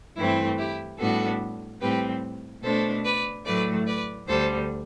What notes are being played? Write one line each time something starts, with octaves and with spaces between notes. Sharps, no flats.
G2 E3 A3 C4 E4
E4 G4
A2 G3 B3 D4 F#4 A4
A2 G3 C4 G4 B4
B2 A3 D4 A4 C5
B4 D5
A2 F#3 A3 B4 D5
B4 D5
D2 D3 G3 A4 C5